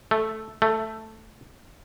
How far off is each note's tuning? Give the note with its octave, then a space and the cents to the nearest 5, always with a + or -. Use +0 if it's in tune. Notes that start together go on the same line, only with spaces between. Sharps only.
A3 -5
A3 +5